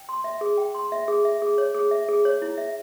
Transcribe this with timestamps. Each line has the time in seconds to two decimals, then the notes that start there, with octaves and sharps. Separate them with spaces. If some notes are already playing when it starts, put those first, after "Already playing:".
Already playing: G5
0.09 C6
0.24 E5
0.41 G#4
0.58 G5
0.75 C6
0.92 E5
1.08 G#4
1.25 E5
1.42 G#4
1.58 C#5
1.75 G#4
1.91 E5
2.09 G#4
2.25 C#5
2.42 E4
2.58 E5